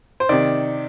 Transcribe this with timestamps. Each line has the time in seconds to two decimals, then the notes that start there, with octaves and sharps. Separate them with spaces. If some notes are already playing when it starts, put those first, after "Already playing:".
0.20 C5
0.29 C3 D#3 D5